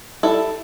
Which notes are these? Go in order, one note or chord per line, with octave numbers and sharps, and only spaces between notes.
G3 E4 A4